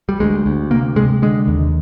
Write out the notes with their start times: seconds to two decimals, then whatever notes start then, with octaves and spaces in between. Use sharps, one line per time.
0.09 G3
0.20 D2 G#3
0.46 D2
0.71 C3 A#3
0.96 C3 G#3
1.22 D3 G#3
1.48 D#2